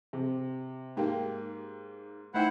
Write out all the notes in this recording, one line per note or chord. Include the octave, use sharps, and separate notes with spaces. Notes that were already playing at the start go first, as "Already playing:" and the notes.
C3
G#2 A#3 D#4 G4 G5
A3 D#4 E4 C5 F#5 G5